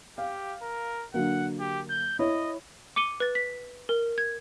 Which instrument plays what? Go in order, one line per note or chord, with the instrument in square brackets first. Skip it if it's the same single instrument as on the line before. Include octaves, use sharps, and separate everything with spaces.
[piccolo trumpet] G4 [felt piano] F5
[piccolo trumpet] A#4
[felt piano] D3 F#3 A#3 [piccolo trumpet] F#5
[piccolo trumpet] G4
G6
[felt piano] E4 C#5 [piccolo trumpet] D#5
[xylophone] D6 C#7 D#7 G7
B4 A6
B6
A#4
G#6